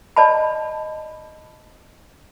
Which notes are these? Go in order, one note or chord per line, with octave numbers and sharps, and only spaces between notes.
D5 D#5 A5 B5